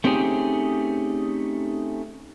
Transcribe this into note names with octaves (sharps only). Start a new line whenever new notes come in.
A3 C4 C#4 D#4 G4 G#4